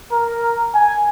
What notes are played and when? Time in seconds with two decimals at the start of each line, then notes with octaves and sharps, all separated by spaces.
0.12 A#4
0.75 G#5